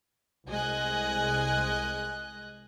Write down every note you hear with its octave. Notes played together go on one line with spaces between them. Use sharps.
C2 G#3 D#5 G#5 F#6